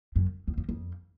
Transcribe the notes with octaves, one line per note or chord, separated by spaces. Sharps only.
F#2
E2
F2
F2